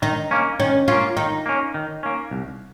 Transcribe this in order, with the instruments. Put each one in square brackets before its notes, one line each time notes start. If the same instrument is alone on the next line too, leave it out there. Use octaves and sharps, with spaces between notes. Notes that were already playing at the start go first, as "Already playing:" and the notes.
[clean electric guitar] D#3 [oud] D#4
[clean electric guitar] A#3 C#4
[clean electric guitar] D#3 [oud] C#4
[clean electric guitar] A#3 C#4 [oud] F4
[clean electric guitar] D#3 [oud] D#4
[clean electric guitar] A#3 C#4
D#3
A#3 C#4
C2